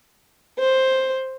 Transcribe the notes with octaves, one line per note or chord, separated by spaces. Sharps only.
C5